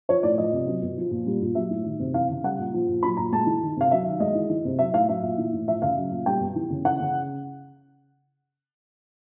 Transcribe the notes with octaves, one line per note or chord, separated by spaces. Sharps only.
F3 C#5
A2 D5
F3 D#5
C3
F#3
B2
F3
A#2
G3
A#2
F#3 E5
A2
D#3
C3
E3 F5
C#3
G3 F#5
A#2
F3
A#2
F#3 B5
A#2 A#5
G#3 A5
E3
D#3
C3 F5
F#3 E5
D#3
G#3 D#5
E3
E3
C3
F#3 E5
A2 F5
F#3 E5
A#2
E3
A2
F3 E5
C#3 F5
F#3
A#2
G3 G5
B2
E3
C#3
E3 F#5
C#3